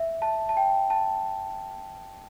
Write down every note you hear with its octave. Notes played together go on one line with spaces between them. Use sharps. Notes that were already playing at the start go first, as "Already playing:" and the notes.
Already playing: E5
A5
A5
G5
A5